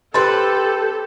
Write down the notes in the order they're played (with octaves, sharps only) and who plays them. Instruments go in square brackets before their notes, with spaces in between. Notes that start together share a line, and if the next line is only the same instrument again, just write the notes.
[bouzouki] C4 B4 [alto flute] G4 [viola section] A4 [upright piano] C6 A6